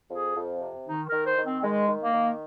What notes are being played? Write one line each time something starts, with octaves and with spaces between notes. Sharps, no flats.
F2 G#4
F2
C3
D#3 D#4
A#4
D#3
C5
D#3
C4
D#3 G#3
D#3
A#3
D#3